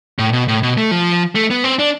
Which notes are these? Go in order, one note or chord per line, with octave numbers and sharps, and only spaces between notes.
A2
B2
A2
B2
A3
F3
A3
B3
C4
D4